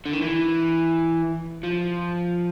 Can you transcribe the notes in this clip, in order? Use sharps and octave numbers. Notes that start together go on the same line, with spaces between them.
D3
D#3
E3
F3